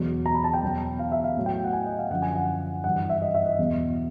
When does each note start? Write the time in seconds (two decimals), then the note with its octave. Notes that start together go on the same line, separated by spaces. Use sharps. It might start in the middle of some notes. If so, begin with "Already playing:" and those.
Already playing: E2 B2 F#3
0.26 A#5
0.34 B5
0.44 A5
0.54 G5
0.63 E2 B2 F#3
0.99 F5
1.12 E5
1.24 F5
1.37 A2 F#3
1.46 G5
1.64 F#5
1.73 G#5
1.86 D#5
1.99 F5
2.10 F#2 D3 F3 F#5
2.22 G#5
2.36 F#5
2.84 G2 E3 F#5
2.96 F#5
3.09 E5
3.22 D#5
3.34 E5
3.46 D#5
3.58 E2 B2 F#3